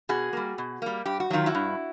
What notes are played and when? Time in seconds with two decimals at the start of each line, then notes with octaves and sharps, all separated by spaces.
0.09 B2 F#4 G#4
0.33 G3 A#3
0.58 B2
0.82 G3 A#3
1.06 G2 G4
1.20 F#4
1.30 D#3 F#3 F4
1.46 E4 F#4
1.55 G2